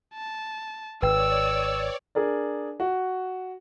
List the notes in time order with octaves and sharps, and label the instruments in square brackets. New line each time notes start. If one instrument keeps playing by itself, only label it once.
[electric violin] A5
[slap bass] G#1 [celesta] B4 G5 [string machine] C#5 D5 [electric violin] E6
[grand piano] D4 G#4 A#4 D5
F#4